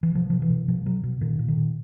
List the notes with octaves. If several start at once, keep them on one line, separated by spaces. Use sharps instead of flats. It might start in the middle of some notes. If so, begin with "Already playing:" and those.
E3
B2 F3
B2 F3
E3
B2
B2 F3
B2 F#3
B2
A#2 D#3
A#2
D#3
A#2